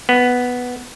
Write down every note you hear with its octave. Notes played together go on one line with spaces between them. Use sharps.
B3